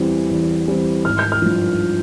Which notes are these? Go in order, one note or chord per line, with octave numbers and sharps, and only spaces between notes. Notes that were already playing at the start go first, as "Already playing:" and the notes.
Already playing: E2 E3 G3 C4
E2
E3 G3 C4
G#1 F6
G6
F6
G2 F3